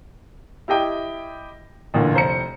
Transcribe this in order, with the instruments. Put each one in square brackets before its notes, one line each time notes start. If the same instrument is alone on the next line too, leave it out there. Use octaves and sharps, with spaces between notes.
[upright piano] E4 G4 D#5 G5
A1 A#2 D3
F1 C5 A#5 C#7